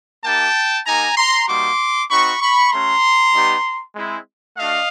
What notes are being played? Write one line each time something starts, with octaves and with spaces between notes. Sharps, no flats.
A#3 D#4 G4 G5 A5
A#3 D#4 G4 G#5 A#5
A#5 C6
G3 A#3 D#4 F#4 C6 D6
C4 D#4 F#4 B5 C#6
B5 C#6
A3 C#4 F#4 A#5 C6
G3 B3 D#4 G4
G#3 C4 E4
A3 D4 F#4 D#5 F5